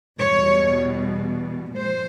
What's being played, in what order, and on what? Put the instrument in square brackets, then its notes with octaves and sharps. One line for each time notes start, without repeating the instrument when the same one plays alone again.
[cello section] E2 B2 G3 C#5
A#2 F3 G#3 C5